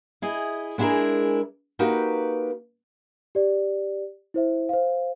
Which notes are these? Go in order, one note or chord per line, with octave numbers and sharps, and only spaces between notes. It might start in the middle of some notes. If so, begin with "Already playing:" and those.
E4 G#4 D#5
G#3 B3 D4 E4 G#4 A#4
A#3 D#4 F#4 G4 B4
G4 D5
E4 C5 E5
C5 F5